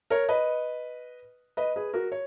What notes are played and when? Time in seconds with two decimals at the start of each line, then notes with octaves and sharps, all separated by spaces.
0.10 A#4 C#5
0.29 B4 D#5
1.57 B4 D#5
1.76 G#4 B4
1.93 F#4 A#4
2.12 C#5